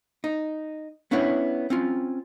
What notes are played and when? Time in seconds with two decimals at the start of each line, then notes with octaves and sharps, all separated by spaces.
0.24 D#4
1.11 B3 C#4 D4 E4 C#5 F#5
1.70 C4 C#4 F4